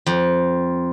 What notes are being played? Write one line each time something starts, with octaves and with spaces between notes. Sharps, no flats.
F2